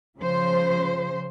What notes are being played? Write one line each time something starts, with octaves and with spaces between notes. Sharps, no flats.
C#3 F3 C5